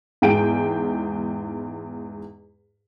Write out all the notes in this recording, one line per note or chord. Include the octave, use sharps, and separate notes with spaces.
E2 G#2 G#4 G5 D7